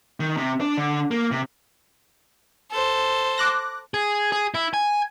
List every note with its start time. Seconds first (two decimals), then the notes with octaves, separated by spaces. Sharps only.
0.20 D#3
0.37 C3
0.61 D4
0.77 D3
1.11 A#3
1.31 C3
2.71 A4 C5
3.38 D6 F#6 A#6
3.94 G#4
4.32 G#4
4.54 E4
4.74 G#5